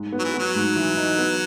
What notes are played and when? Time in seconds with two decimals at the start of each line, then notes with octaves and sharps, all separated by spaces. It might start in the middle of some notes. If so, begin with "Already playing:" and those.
Already playing: G#2
0.13 B3
0.19 F#3
0.24 E3
0.34 B3
0.39 F#3
0.55 G#2
0.76 E3
0.97 D#4
1.19 B3